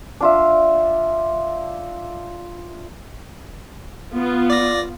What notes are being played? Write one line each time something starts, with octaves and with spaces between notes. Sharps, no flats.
D4 F4 E5
B3 F4
D5 A#6